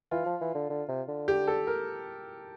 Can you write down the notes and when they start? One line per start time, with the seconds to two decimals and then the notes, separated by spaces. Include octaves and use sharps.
0.11 E3 F4
0.26 F3
0.41 E3
0.55 D3
0.70 D3
0.89 C3
1.08 D3
1.28 G4
1.47 A4
1.67 A#4